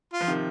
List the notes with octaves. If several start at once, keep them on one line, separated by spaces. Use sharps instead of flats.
F4
F3
C3 D#3